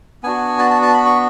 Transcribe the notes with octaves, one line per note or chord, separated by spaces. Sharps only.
B3 D4 F#4 G#5
A5
A5
A5
B5
C#6